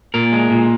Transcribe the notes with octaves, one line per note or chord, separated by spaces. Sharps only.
A#2 A#4
G#3
A#2